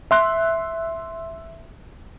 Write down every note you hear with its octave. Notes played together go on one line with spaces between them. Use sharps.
E5 C6 F#6